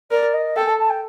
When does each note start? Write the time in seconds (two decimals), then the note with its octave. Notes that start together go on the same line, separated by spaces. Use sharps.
0.11 A#4 D5
0.34 D#5
0.56 A4 G5
0.67 A5
0.79 A5
0.90 G5